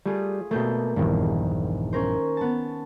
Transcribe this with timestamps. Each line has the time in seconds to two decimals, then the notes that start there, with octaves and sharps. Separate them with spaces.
0.06 G3 A3 F4 G#4
0.51 B2 A3 A#3 G6
0.96 A#1 E2 G2 D#3
1.93 C#4 A#4 C5
2.37 B3 A5